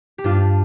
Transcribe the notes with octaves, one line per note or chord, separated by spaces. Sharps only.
G4
G2 D4 F4